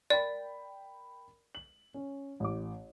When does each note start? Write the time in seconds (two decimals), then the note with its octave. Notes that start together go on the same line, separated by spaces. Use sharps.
0.10 A#4 D5 G5 B5
1.55 F#7
1.94 C#4
2.40 A1 D6